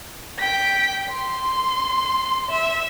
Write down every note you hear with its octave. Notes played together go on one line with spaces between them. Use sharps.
G5 B6
C6
E5